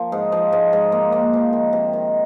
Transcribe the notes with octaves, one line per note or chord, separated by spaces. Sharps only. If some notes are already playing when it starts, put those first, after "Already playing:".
Already playing: F3 A#3
G#2
F3
G#2
G#2
A#3
A#3
F3
D#3
C3
D#3